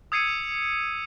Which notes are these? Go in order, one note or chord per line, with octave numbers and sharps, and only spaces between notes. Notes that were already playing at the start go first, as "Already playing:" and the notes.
D#6 E6 G#6 C7 C#7 D#7